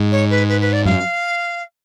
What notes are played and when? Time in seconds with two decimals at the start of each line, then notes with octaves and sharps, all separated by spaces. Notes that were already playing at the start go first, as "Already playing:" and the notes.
Already playing: G#2
0.11 C#5
0.30 B4
0.49 B4
0.60 B4
0.72 D5
0.85 F#2 F5